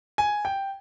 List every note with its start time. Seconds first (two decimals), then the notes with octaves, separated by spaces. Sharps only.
0.18 G#5
0.45 G5